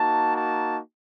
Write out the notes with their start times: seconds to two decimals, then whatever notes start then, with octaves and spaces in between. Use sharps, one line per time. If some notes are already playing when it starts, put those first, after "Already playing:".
Already playing: A#3 D#4 F#4 A5
0.37 A5